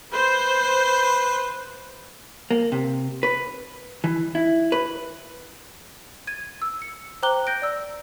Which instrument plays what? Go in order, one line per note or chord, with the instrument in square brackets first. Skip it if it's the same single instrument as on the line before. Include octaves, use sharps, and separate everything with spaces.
[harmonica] B4 [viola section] C5
[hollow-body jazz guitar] A#3
C3
B4
E3
E4
B4
[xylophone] G#6 A6 D#7
E6
C#7
C5 G5 A#5 D6 F#6 G7
G6 A#6 D7
D5 E6